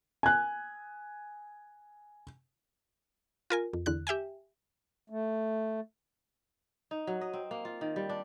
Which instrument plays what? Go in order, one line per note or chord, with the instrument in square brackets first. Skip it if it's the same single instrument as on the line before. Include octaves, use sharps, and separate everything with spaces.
[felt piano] G#5 F#6
[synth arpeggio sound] F4 A#4 G#5
F2
E2 D3 F#6
G4 E5 G5 G#5
[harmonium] A3
[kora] D#4
F#3
D#5
C4
A#3
F4
D#3
G3
D4